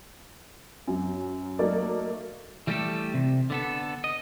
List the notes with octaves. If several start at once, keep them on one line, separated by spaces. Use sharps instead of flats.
F#2 F#3
F#3 A3 A#3 D#4 D5
E3 G3 A3 D#4 G4 A4
C3
D3 B3 A4
D#5